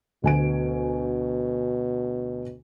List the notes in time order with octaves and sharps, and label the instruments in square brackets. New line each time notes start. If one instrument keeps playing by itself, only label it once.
[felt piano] D2 G#5 D7 [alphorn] B2